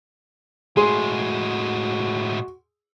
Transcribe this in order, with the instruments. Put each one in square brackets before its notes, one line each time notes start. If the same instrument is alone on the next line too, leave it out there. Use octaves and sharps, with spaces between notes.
[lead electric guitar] A2 G#3 [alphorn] F#4 [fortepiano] G#4 [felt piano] C6